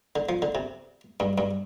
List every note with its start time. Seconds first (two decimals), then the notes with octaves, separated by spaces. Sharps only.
0.16 D3
0.29 F3
0.42 D3
0.55 C3
1.20 G2
1.38 G2